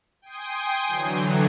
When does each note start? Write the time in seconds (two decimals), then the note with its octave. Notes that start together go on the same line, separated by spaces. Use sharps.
0.22 G5 G#5 C6 D#6
0.87 D3 E3 F#3